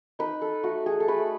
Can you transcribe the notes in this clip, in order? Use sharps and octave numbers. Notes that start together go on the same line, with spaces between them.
D#4 B4
A4
A3 F#4
G#4
A4
A3 B4